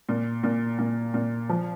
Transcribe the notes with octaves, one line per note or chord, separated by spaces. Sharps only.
A#2
A#2
A#2
A#2
F3